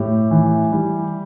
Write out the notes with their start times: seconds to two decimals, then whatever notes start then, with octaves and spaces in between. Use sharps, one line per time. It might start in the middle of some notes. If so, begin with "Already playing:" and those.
Already playing: A2 G4
0.31 E3
0.72 G3